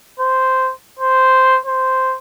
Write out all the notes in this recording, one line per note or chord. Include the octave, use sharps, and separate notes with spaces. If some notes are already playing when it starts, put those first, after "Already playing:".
C5
C5
C5